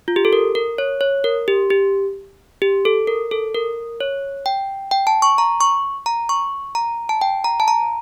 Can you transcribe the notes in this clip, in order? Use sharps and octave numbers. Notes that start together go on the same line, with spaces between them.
F4
G4
A4
A#4
A#4
C#5
C#5
A#4
G4
G4
G4
A4
A#4
A4
A#4
C#5
G5
G5
A5
C#6
A#5
C#6
A#5
C#6
A#5
A5
G5
A#5
A5
A#5